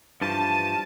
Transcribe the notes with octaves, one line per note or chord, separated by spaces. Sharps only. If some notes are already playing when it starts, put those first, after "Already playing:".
G2 E3 F3 A5 D#7